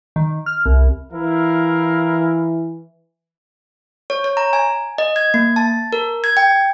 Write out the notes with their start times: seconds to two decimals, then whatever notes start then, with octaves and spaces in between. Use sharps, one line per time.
0.16 D#3
0.46 F6
0.65 C2
1.13 E3 E4 A#4 F5
4.10 C#5
4.24 C#5
4.37 A#5
4.53 G#5
4.98 D#5
5.16 G#6
5.34 A#3
5.56 A5
5.93 A#4
6.24 G#6
6.37 G5